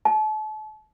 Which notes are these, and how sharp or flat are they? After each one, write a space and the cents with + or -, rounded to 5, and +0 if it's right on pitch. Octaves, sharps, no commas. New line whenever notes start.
A5 -35